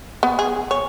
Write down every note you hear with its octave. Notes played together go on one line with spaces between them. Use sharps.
B3
G#4
C#5